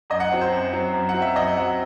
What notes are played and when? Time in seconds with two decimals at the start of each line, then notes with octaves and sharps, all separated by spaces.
0.10 F#2 D#5
0.20 F#5
0.31 F#3 C4
0.41 C5
0.52 F#2
0.73 F#3 C4
0.94 F#2
1.09 F#5
1.14 F#3 C4
1.22 E5
1.35 F#2 D#5
1.57 F#3 C4 F#5